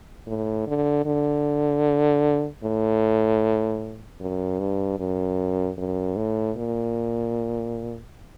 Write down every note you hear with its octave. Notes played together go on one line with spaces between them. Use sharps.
A2
D3
D3
A2
F#2
G2
F#2
F#2
A2
A#2